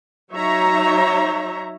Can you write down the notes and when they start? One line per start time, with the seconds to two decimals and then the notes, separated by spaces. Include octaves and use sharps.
0.33 F#3 D#4 C#5 E5 A#5